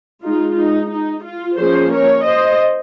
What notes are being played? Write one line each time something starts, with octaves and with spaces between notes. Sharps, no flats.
G#3 D#4 F4
D#4
D#4
F4
F3 A#3 C#4 G#4 C5
A#4 C#5
C5 D#5